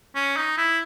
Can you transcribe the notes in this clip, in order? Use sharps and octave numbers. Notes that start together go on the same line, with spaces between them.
C#4
D#4
E4